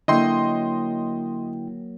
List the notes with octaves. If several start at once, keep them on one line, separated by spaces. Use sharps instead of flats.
D3 F#3 A#3 E4 D#5 G5 C6